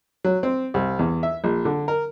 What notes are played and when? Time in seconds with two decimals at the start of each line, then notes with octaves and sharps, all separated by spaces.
0.24 F#3
0.43 C4
0.74 C2
0.99 E2
1.23 E5
1.44 A#1
1.65 D3
1.88 A#4